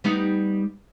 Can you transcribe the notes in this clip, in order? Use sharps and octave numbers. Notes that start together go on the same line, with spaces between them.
G3 B3 D#4